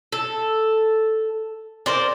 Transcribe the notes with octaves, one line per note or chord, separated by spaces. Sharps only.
A4
A#4 C5 D5